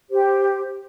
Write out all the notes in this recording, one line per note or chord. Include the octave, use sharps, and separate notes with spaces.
G4 C5